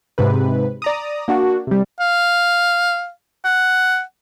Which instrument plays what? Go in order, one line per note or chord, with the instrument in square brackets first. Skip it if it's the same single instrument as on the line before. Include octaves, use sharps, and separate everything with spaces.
[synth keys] G#2 C3 B4
D5 A#5 D#6
A#3 D4 F#4
C3 G3
[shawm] F5
F#5